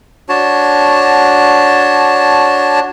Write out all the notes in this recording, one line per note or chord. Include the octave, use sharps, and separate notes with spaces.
D4 F#4 C#5 A5